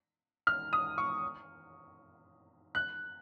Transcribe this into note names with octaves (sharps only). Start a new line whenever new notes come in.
F6
D#6
C#6
F#6